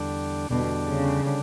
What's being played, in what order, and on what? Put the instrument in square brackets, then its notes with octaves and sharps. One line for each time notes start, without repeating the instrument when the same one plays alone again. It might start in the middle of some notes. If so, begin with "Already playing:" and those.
Already playing: [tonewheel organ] E2 D3 G3 D4
[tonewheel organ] E2 D3 G3 D4 [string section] B2
[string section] C#3
[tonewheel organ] D3 G3 D4